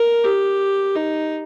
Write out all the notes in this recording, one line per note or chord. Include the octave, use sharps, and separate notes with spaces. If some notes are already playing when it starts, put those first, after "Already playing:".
Already playing: A#4
G4
D#4